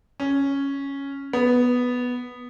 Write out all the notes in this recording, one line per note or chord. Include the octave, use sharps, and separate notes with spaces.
C#4
B3